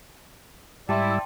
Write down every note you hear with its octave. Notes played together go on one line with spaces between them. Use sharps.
G#2 G3 E4 D5 G5 A5 C6 E6